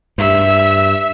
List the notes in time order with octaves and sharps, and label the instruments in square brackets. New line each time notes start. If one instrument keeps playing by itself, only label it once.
[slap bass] G2 [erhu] E5